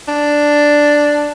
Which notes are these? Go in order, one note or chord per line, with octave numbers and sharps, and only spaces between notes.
D4